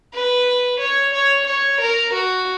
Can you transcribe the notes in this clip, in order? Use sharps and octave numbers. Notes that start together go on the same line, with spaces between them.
B4
C#5
C#5
C#5
A#4
F#4